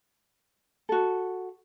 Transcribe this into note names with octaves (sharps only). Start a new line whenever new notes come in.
F#4 A4